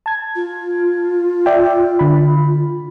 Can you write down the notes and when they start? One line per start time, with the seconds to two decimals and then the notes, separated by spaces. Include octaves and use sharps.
0.06 A5 G#6
0.36 F4
1.46 D5 E5 G5
1.99 D3 B5